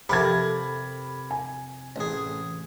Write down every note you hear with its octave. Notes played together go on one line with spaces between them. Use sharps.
F2 C3 G4 A4 A#4 B5 G#6
G#5
A1 G#4